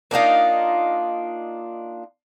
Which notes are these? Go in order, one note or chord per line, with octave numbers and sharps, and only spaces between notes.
A#3 D4 D#4 F4